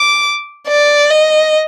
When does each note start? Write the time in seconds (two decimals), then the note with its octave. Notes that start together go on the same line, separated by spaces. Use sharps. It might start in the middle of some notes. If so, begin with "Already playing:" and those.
Already playing: D6
0.68 D5
1.11 D#5